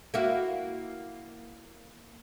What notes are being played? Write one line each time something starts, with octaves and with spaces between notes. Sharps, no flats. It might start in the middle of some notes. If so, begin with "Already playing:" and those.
A#3 E4 F#4